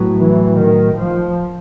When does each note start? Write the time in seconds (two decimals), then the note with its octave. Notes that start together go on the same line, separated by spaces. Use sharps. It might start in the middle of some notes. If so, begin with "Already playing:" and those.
Already playing: A2 F#3 B3
0.16 E3
0.57 D#3
0.97 F3